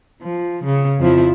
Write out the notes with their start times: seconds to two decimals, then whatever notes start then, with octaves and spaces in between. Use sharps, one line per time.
0.23 F3
0.64 C#3
0.99 F2 F3 E4